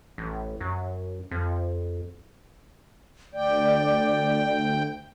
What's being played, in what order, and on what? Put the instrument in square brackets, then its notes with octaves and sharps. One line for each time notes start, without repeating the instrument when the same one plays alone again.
[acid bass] A1
F#2
F2
[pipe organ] D2 G5 [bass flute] D5